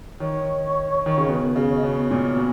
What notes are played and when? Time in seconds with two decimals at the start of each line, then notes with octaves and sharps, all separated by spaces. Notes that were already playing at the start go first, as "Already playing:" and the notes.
0.20 D#3 C#5
1.06 D#3
1.18 C#3
1.28 B2 B4
1.43 A#4
1.56 C#3
1.70 C#5
1.76 D#5
1.83 B2 C#5
2.11 A#2
2.37 B2